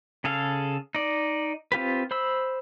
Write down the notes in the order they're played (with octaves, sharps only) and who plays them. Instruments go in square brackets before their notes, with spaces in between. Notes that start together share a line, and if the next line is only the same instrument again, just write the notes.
[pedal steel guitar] C#3 G#4 A4 F5
D#4 D5
C4 F4 G4 B4
C5 B5 E6